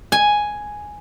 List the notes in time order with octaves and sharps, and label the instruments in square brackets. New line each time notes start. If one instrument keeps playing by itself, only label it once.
[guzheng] G#5